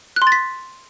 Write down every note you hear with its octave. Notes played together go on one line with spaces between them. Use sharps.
F#6
C6
A6
B6